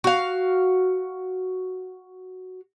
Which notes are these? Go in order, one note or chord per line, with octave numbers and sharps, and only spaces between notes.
F#4 F5